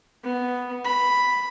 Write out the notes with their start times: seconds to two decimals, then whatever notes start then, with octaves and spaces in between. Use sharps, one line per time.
0.23 B3
0.84 B5